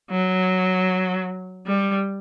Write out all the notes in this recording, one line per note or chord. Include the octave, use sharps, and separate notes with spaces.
F#3
G3